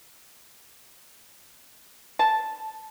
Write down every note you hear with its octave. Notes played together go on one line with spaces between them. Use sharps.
A5